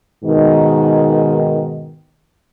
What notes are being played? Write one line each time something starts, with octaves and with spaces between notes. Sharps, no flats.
G#2 B2 D#3